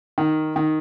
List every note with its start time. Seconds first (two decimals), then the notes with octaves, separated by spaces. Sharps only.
0.18 D#3
0.56 D#3